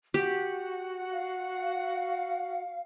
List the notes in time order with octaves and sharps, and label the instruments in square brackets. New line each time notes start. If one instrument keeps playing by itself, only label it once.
[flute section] F#4 F#5 [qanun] G4
[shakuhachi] F5